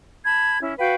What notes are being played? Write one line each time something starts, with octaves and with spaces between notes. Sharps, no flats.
A5 B5 G#6
C#4 E4
F#4 B4 F5 G5